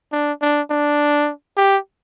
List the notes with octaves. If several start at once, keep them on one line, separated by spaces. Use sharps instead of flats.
D4
D4
D4
G4